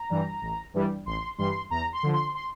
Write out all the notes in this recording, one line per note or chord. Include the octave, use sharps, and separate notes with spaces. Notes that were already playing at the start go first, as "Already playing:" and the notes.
Already playing: A#5
G2 E3 G3
A1
G2 E3 G3
A1 C6
G2 E3 G3 C6
E2 A#5
C6
D3 F3
C6
C6